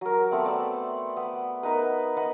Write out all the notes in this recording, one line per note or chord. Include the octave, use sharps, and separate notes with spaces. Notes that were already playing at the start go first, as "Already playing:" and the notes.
F#3 A#4
A3 B3 C4 F5
D5 E6
B3
B3 D#4 A#4 B4
B3 D#5 F#5